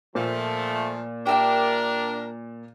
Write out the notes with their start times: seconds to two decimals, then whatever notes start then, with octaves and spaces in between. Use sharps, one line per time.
0.15 A#2 F3 A3
1.26 D4 G4 A#4 E5 G5